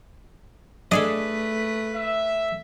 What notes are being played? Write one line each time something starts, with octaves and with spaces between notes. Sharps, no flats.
A3 D4 G#4 A4 B4 D#5
E5